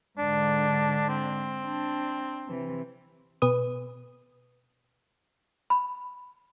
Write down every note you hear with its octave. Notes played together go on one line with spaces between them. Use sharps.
G#2 D3 D4
C4
D4
C3 E3
B2 B4 D#6
B5